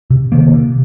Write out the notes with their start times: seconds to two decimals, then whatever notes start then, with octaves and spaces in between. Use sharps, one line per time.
0.10 C3
0.32 D#3 A#3
0.54 C3